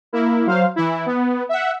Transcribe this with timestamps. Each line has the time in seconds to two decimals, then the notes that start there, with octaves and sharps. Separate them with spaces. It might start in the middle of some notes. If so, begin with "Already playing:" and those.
0.13 A#3 E4 A#4
0.47 F#3 C5 F5
0.76 E3 E4
1.06 B3
1.49 E5 F#5